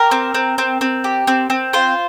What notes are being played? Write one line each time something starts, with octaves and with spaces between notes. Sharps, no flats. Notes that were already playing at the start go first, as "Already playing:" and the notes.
Already playing: G4 A#4
C4
C4
C4
C4
G4
C4
C4
F4 C5